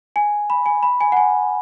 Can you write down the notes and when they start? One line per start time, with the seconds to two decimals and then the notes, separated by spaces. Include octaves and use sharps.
0.16 G#5
0.50 B5
0.66 G#5
0.83 B5
1.01 G#5
1.12 F#5
1.17 G#5